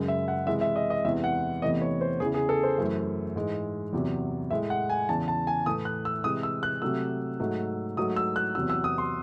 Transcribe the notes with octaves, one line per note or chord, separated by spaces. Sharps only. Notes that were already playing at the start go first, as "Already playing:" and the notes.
Already playing: F#2 C#3 G#3
E5
F#5
C3 E3 G#3 E5
E5
D#5
D#5
E2 C3 E3 G#3 E5
F#5
E2 C3 E3 A3 D#5
C#5
C5
E2 C#3 E3 G#4
G#4
A4
C5
F#2 E3 A3
G#2 E3 G#3
E2 C3 F#3
A2 G#3 E5
F#5
G#5
E2 C#3 E3 A5
A5
G#5
A2 E3 A3 D#6
F#6
E6
C3 E3 G#3 D#6
E6
F#6
C3 F#3 A3 E6
G#2 F#3 A3
G#2 F#3 A3 D#6
E6
F#6
E2 C3 F#3 E6
E6
D#6
C6